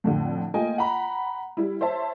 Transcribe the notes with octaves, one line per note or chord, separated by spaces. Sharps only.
F2 A2 D3
A3 A#3 F4 D#5 G5 G#5
F#5 A#5 B5
G3 E4
C5 C#5 E5 A5